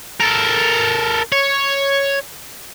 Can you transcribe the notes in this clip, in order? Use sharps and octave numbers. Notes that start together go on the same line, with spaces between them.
A4 A#4
C#5